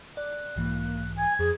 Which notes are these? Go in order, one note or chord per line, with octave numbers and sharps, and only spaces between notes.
D5 F#6
B1 G#2 E3 A#3
G#5 G#6
F2 G#4